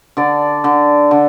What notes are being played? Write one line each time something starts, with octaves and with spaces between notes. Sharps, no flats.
D3 D5
D3
D3